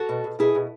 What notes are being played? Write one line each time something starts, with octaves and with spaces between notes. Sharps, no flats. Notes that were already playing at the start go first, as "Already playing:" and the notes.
Already playing: F#4 A4
B2
B2
B2 E4 G#4
B2